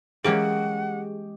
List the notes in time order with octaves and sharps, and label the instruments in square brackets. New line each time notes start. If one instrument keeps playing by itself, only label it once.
[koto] E3 A#3 C#4 [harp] G#3 G4 [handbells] G#4 [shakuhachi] F#5